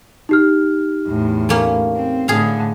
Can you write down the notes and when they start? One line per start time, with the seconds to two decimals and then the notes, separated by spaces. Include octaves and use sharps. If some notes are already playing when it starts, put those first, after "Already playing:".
0.29 D#4 G4 F6
1.07 E2 A2
1.49 A3 A#3 C#4
1.95 C4
2.28 A2 D3 G#4 F5